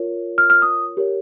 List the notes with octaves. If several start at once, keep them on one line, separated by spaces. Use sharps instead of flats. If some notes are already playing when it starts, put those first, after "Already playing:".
Already playing: F4 A#4 C#5
F6
F6
D#6
G4 A#4 C#5